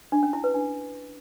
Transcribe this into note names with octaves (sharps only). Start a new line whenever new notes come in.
D4
C#4
E4
B4
D4